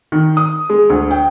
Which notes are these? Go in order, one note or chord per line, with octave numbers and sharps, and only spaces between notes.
D#3
D#6
G#3
D2
G5